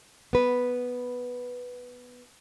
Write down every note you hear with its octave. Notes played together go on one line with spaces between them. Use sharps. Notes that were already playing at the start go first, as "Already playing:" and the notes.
B3 B4